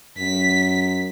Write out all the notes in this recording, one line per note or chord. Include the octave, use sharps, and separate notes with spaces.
F#2 B6